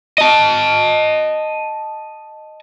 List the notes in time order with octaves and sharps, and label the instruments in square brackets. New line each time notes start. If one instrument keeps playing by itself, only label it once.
[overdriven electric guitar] D#5 A5